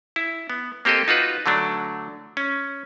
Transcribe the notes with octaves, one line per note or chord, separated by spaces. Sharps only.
E4
B3
A#3 C4 G4 A4 D#5
D#4 F4 F#4 B4
D3 F#3 A3 D4
C#4